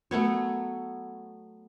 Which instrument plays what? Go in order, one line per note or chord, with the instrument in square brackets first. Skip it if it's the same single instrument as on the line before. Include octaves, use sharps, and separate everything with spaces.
[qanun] F#3 A3 B3 C#5